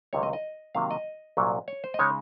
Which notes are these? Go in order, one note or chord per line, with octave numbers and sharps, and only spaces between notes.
C#2 C3 D#3 F#3 C4 C#5
D#5
D#5
C3 D#3 F#3 A#3 F5
D#5
C2 A#2 F#3 C#4
C#5
C5
D#5
C#3 G#3 D#4 C#5